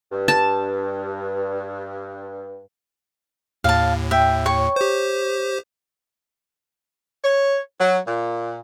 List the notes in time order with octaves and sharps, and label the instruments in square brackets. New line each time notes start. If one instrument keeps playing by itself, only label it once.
[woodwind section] G2
[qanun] A5
[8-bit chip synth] D#2 A2 [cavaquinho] F5 A5
[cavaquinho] E5 G5
C#5 C#6
[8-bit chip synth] G4 C5
[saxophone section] C#5
F#3
A#2